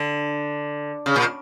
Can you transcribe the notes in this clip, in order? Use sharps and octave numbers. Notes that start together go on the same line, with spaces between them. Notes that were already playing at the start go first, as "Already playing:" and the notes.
Already playing: D3
C#3
A#2